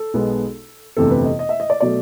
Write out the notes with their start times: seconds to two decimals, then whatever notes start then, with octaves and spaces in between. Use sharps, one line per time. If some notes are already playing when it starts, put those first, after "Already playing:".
Already playing: A4
0.14 B1 B2 G#3 B3
0.97 G1 F2 C3 E3 A3 A4
1.11 B4
1.24 D#5
1.39 D#5
1.49 E5
1.60 D#5
1.70 D5
1.81 B2 F#3 A3 D5